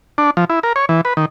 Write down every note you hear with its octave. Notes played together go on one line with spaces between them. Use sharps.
D4
F3
E4
A#4
C#5
E3
B4
D#3